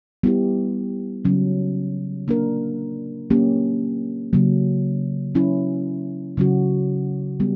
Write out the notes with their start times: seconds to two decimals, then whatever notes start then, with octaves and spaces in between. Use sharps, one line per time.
0.23 G3 B3 E4 G4
1.25 C#3 F#3 C#4
2.28 A#3 D4 A#4
3.30 F#3 A#3 C#4 G4
4.33 C#3 F#3 A#3
5.35 F#3 C#4 E4
6.37 C#3 F#3 C#4 F#4
7.40 G3 B3